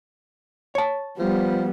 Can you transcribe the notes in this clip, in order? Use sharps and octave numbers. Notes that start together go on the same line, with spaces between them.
C#5 A5
F3 G3 B3